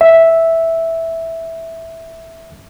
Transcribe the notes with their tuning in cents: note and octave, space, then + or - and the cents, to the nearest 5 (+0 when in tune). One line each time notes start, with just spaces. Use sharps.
E5 -5